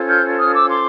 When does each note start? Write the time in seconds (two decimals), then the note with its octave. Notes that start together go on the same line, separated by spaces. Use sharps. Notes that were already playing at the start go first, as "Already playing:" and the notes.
Already playing: C#4 F4 A4 C5
0.08 F6 G6
0.38 D#6 F6
0.54 D6 E6
0.69 C6 D6